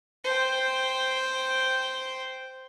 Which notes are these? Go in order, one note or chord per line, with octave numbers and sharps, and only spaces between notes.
C5 G5